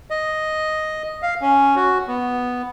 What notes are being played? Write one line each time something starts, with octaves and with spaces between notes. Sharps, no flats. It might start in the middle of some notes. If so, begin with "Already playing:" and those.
D#5
F5
C#4
F#4
B3